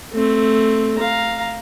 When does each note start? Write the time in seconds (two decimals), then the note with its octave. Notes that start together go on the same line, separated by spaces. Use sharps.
0.13 A3 C4
0.99 F5 A#5